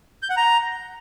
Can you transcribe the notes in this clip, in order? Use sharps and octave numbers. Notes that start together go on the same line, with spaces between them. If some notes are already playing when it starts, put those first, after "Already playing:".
G6
F#5
A#5